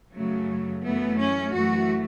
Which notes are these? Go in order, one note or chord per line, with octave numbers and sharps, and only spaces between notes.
F#2 C#3 F#3 A3
F#2 E3 A3 B3
C#4
F#2 E3 A3 F#4